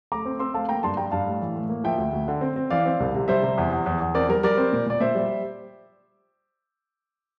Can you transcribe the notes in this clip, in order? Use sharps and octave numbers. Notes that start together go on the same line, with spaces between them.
A3 A#5 D6
C4
C4 C6 E6
A3 F5 A5
A#3 G5 A#5
G2 A5 C6
G3 G5 A#5
G2 F5 A5
A2
E3
A2
A#3
F3 E5 G5
D2
D2
D3
C4
C4
E3 D5 F5
C4
C2
C3
G3 C5 E5
C3
E2
E2
E2
E2
C4 A#4 D5
G3 A#4
G3 A#4 D5
C4
A#2
A#2 D5
A#2 C5 E5
G3